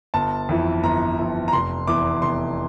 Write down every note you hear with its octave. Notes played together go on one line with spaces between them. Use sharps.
G1 A5
F2 E3
G1 A#5
F2 E3
A#5
F1 C6
E2 E3 D6
F1 C6